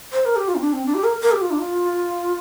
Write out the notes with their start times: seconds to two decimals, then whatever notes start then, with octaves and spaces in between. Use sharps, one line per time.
0.12 C5
0.25 A#4
0.36 G4
0.48 F4
0.55 C4
0.61 D4
0.73 C4
0.86 D4
0.94 G4
1.04 A#4
1.22 A#4
1.32 G4
1.41 F4
1.51 D4
1.60 F4